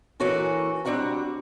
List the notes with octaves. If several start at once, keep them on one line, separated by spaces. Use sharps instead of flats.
E3 A#3 C#4 F#4 A4 A#4
G3 C4 D4 F#4 F#5 A#5